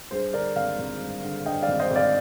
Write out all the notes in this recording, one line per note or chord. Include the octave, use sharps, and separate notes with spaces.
G2 G#4 C5
D3 A#4 D5
G#1 D5 F5
G#1
G2
D3
G2 D#5 G5
D5 F5
G#1
C5 D#5
G#1
D5 F5